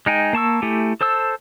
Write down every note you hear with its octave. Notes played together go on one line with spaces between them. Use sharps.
G#3 D#4 G5 G#5
A#3 A5 C#6 E6
A3 E4 G4 G#5
A4 C5 A5 E6